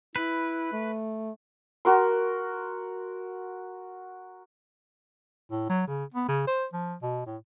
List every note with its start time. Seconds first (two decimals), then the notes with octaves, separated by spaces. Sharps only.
0.16 E4 B4
0.72 A3
1.85 F#4 A#4 C6
5.51 A2
5.69 F#3
5.87 C#3
6.14 B3
6.28 C#3
6.47 C5
6.73 F3
7.02 B2
7.26 A2